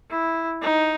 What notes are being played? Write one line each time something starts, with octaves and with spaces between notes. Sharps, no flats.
E4
D#4